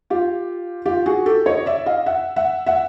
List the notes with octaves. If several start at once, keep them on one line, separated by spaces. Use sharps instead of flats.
F4 G4
F4 G4
F#4 G#4
G4 A4
C#5 D#5
D5 E5
D#5 F5
E5 F#5
E5 F#5
E5 F#5